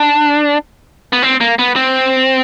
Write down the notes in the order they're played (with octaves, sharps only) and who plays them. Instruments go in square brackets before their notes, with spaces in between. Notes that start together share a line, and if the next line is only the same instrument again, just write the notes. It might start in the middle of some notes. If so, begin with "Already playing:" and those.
Already playing: [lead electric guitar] D4
B3
C4
A#3
B3
C4